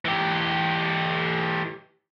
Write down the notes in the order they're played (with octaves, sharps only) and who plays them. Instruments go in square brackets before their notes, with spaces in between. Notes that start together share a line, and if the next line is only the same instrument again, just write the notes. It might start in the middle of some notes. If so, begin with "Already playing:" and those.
[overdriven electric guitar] E3 G4